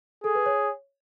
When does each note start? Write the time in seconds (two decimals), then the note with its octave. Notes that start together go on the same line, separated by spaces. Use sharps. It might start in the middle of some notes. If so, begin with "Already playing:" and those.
0.24 G#4 A4
0.35 B4
0.46 C#5